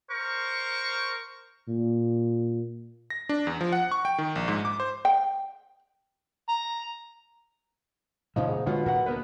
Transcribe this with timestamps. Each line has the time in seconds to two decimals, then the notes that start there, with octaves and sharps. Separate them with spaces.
0.10 A#4 C5 C#6
1.68 A#2
3.10 A#6
3.29 D4
3.47 E2
3.61 F3
3.73 F#5
3.92 C#6
4.05 G5
4.18 D#3
4.36 A#1
4.48 G#2
4.65 D6
4.80 C5
5.05 G5
6.49 A#5
8.36 A#2 C#3 E3 F3 D#4 C#5
8.48 G#2
8.66 B2 D3 G#3 D4 F4 C#5 F#5
8.86 D2 A#2 D#3 A#4 F#5
9.06 D2 A#3 B3 B4